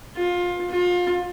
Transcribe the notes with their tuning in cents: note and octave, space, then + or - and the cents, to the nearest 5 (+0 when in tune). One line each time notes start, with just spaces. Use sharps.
F4 +20
F4 +30